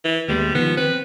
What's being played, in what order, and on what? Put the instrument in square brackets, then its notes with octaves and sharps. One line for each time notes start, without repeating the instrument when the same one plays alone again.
[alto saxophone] E3
[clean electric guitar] D#2 G#3 B3 [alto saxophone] G3
[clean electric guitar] D#3 F3 [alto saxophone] B3
[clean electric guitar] C4 [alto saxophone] B4